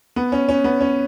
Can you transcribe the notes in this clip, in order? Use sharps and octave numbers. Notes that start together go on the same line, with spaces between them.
B3
C#4
C#4
B3
C#4